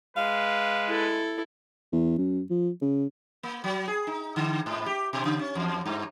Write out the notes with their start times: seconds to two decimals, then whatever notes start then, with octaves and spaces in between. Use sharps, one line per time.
0.17 G#3 B4 F5
0.88 E4 A4
1.92 E2
2.18 F#2
2.50 F3
2.81 C#3
3.43 A#3
3.64 F#3
3.88 G#4
4.07 D#4
4.36 D3
4.66 G#2
4.86 G4
5.13 B2
5.25 C#3
5.39 C#4
5.55 E2
5.86 G2